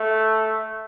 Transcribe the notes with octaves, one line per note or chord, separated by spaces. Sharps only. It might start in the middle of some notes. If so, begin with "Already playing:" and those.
Already playing: A3